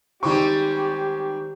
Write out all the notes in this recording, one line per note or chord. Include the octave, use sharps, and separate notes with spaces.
D#3 G3 G#3 C4 G4 C#6